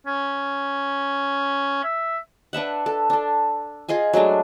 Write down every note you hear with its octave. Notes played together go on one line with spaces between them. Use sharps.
C#4
E5
D4 B4 E5 F#5
A4
D4 A4
F4 G#4 D#5 G#5
F#3 G#3 A3 D4